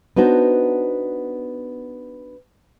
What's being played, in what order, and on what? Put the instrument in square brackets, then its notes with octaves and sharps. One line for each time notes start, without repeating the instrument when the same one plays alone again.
[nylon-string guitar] B3 D4 D#4 F#4 C5